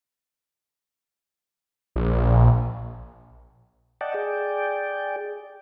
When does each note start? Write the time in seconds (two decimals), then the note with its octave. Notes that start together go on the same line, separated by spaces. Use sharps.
1.96 A#1
4.01 D5 D#5 F#5 G5 A5
4.14 G#4 D5 G5